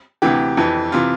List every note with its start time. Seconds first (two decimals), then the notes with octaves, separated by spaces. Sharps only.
0.22 D2 C3 E3 G4
0.57 F2 E3
0.92 C3 E3 F4